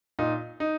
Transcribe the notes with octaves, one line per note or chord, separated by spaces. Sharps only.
A#2 D#4
D#4